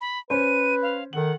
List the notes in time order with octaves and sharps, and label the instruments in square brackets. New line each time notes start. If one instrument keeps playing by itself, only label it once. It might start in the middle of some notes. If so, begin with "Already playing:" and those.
[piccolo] B5
[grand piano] C#4 C5 [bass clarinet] B4 [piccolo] D#7
[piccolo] F5
[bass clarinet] D#3 [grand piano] A4 F#7 [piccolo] F#5